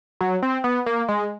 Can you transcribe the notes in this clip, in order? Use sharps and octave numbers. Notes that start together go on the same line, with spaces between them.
F#3
C4
B3
A#3
G#3